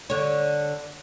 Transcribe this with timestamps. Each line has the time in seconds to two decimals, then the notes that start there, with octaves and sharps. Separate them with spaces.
0.10 D3 C#5